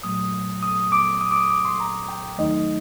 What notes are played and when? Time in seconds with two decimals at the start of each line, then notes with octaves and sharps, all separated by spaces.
0.03 A#2 F#3 A3 D#6
0.63 D#6
0.92 D6
1.21 D#6
1.31 D6
1.36 D#6
1.50 D6
1.65 C6
1.80 A#5
2.09 G5
2.38 D#2 D#3 F#3 A3 D#4 D#5